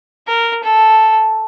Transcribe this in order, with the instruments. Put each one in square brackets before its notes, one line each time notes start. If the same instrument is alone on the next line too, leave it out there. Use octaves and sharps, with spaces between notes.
[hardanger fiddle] A#4
A4